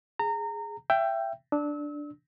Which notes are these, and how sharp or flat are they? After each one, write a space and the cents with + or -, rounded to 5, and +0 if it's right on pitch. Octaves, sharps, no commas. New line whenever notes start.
G#4 +0 A#5 -25
E5 +25 G5 +0
D4 +0 E6 -35